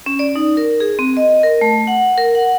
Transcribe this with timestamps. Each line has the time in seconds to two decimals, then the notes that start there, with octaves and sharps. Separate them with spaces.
0.06 C#4
0.19 D5
0.35 D#4
0.57 A#4
0.80 G#4
0.99 C4
1.17 D#5
1.43 A#4
1.61 A3
1.87 F#5
2.18 A#4
2.35 F#5